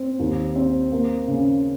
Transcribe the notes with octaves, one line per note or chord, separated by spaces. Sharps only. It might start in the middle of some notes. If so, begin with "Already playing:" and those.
Already playing: C4
D#2
C4
A#3
C#3